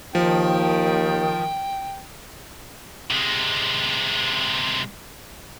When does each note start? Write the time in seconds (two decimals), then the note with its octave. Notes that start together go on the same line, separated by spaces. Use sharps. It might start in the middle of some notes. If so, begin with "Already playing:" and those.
0.15 D#2 D#3 F3 G5
3.11 C3 G#3